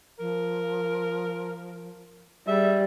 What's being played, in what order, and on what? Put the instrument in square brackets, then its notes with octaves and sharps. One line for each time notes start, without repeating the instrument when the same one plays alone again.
[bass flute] F3 [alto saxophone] A#4
[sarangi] G3 [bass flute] G#4 [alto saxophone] E5